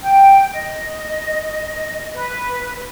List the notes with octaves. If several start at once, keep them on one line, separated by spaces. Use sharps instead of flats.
G5
D#5
B4